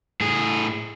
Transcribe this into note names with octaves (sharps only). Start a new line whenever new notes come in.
A2 G#4